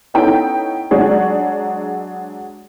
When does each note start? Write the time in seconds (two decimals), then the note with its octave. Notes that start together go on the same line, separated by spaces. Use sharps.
0.14 B3 C#4 D#4 E4 A4 G5
0.91 F#3 G#3 D4 F#4 G#4 C#5